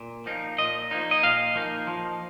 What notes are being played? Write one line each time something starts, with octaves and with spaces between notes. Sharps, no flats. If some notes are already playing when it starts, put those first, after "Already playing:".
Already playing: A#2
F3 A#3 D#4
A#2 D#5
F3 A#3 D#4
D#5
A#2 F5
F3 A#3 D#4
F3